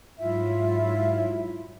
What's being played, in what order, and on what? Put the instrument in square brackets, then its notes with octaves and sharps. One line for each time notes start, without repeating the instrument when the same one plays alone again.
[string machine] G#2 F#3 [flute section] E4 F4 E5